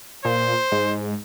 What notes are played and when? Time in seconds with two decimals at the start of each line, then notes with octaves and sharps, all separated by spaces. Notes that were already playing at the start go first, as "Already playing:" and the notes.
0.25 A#2 C5
0.72 G#2